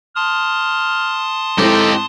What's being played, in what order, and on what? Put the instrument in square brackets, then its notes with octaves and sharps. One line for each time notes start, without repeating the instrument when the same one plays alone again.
[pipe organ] A5 C6 D#6 [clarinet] F6
[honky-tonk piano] G#2 C4 E4 [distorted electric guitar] D#4 G4 [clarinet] A4